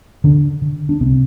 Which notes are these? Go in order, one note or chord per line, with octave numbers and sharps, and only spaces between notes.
D2 D3 D4
D3
D4
C2 C3 C4